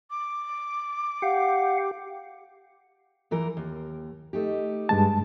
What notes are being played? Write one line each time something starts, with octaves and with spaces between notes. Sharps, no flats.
D6
G4 F5 F#5
E2 E3 A#4
D#2
A3 D#4 G4
G2 G#3 A5